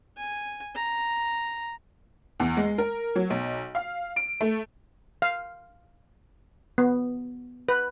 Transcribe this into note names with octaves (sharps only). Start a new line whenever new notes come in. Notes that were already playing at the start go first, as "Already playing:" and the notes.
G#5
A#5
E2
G#3
A#4
F#3
B1
F5
D7
A3
F5
B3
B4